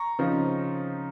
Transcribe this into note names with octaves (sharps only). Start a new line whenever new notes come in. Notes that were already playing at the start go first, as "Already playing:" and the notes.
Already playing: A#5 C#6
C#3 F3 C4 D#4